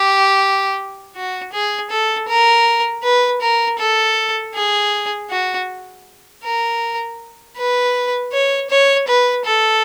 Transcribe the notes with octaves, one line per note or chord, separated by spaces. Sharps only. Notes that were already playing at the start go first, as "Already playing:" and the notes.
Already playing: G4
F#4
G#4
A4
A#4
B4
A#4
A4
G#4
F#4
A#4
B4
C#5
C#5
B4
A4